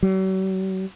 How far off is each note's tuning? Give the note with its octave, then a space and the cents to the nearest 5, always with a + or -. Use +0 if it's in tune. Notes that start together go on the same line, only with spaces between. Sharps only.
F#3 +45